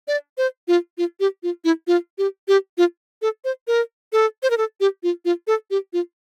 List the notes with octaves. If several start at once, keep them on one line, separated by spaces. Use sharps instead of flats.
D5
C5
F4
F4
G4
F4
E4
F4
G4
G4
F4
A4
C5
A#4
A4
C5
A#4
A4
G4
F4
F4
A4
G4
F4